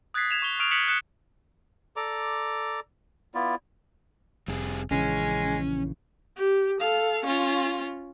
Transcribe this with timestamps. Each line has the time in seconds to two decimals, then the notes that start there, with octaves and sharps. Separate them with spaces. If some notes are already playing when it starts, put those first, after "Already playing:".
0.14 D#6 F#6 G#6 A6 B6 C7
0.31 G#6 E7 F7
0.42 C#6 F7 G7
0.59 C#6 D#6 F6 D7 F7
0.71 D#6 F#6 B6 C#7 E7 F#7
0.88 D#6 F#6 G#6 C#7 E7
1.96 A4 D5 A#5 D6
3.34 B3 E4 F4 D5
4.48 F1 G3 C4 G#4
4.91 A#1 C#3 E3 G#3 C#4
6.37 G4
6.80 A4 F5
7.25 C#4 F4